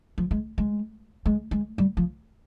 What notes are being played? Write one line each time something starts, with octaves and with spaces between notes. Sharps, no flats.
F3
G#3
G#3
G#3
G#3
G3
F3